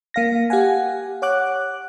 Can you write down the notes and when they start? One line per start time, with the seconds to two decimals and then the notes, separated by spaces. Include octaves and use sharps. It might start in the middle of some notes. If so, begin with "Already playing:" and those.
0.14 A#3 F5 A#6
0.50 G4 F5 F#5 G#5
1.22 C#5 F#5 D6 F#6